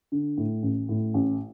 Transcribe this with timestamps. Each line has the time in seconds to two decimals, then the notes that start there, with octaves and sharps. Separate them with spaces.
0.12 D3
0.38 A2
0.63 A1
0.89 A2
1.14 A1